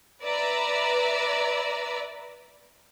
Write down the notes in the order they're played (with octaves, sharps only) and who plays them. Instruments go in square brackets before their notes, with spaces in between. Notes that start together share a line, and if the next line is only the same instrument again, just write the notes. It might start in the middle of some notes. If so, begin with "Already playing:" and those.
[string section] B4 D5 E5 A#5